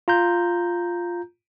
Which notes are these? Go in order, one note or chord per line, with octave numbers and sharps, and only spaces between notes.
F4 A#5 G6